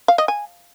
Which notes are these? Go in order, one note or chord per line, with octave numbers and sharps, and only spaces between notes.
F5
D#5
G#5